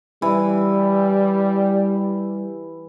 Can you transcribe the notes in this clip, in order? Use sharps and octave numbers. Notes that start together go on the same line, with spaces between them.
E3 G3